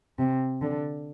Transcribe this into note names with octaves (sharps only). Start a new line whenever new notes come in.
C3
D3